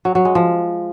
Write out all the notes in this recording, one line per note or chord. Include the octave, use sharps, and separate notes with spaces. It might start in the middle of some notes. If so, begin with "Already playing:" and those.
F#3
F#3
G#3
F3